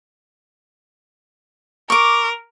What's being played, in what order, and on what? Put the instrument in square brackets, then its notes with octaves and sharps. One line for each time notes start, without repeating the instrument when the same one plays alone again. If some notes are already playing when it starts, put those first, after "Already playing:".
[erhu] A#4 [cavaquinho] C#6 D6